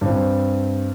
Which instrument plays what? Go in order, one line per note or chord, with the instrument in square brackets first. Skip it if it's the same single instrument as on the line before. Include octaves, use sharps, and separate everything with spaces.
[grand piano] G2 C4